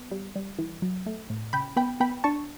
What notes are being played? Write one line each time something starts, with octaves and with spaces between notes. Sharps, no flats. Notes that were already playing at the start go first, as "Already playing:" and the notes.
Already playing: B3
G3
G3
E3
F#3
A3
A2
C#3 G5 B5
B3 G5 B5
B3 G5 B5
D4 A5 C#6